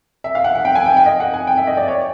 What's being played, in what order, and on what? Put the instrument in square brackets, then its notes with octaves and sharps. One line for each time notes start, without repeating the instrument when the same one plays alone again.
[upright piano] E5
F5
F#5
F#5
G5
G#5
G5
G5
D#5
F#5
G#5
G5
E5
D#5
D5
C#5